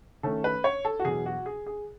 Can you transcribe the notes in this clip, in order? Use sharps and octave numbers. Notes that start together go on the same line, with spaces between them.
D#3 A3 C#4 A4
B4
C#5
A4
F#4
E2 B2 F#3 G#4
F#4
G#4
G#4